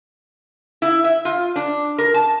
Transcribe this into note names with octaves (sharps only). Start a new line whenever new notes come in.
E4
E5
F4
D4
A#4
A5